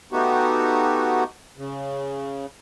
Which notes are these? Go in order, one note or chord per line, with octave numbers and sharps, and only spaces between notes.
A3 B3 D#4 F#4 G4
C#3